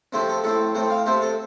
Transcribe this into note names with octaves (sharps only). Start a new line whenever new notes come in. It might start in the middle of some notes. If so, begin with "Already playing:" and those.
C3 F3 A3 C4 C5
A4
A2 A3 C4 A4
A2 A3 C4 C5
F5
C3 A3 C4 C5
A4